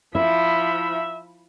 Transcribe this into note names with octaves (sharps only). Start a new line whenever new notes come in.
F3 E4 E5 B5